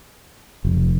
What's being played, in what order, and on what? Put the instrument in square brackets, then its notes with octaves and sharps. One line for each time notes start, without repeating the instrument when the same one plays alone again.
[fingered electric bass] F1